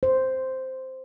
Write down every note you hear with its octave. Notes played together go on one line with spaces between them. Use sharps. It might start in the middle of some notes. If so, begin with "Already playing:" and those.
C5